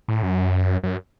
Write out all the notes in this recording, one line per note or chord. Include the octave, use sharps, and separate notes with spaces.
A2
F#2
F#2